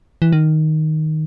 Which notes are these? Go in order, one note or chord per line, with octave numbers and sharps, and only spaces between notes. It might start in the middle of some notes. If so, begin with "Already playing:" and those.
E3
D#3